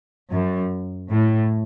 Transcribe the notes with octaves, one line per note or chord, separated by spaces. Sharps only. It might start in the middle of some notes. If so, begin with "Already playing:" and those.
F#2
A2